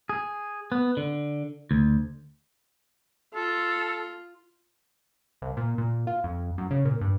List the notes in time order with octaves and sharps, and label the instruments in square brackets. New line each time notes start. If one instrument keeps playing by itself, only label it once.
[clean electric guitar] G#4
B3
D3
D2
[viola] F4 [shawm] A4
[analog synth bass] C2
A#2
A#2
F4
F2
F#2
C#3
A#2
G2